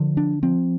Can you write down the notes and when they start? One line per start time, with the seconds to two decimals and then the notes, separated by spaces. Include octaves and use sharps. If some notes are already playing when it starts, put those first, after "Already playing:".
Already playing: D3 F3
0.17 D4
0.43 F3 C4